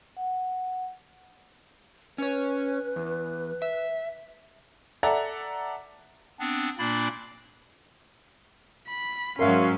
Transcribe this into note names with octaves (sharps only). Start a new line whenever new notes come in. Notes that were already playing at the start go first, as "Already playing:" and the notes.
F#5
C#4 B4 C#5
E2
E5
A4 D5 E5 F#5 A#5
B3 C4 D4
A#2 A#3 D4 D5 B5
B5
G#2 F#3 C#4 F#4 A#4 E5 F5 C6